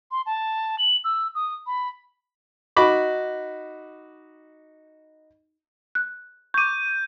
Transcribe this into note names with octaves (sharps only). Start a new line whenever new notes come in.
C6
A5
F#7
E6
D#6
B5
D#4 F#4 B5 D6
F#6
C#6 D6 G6 D#7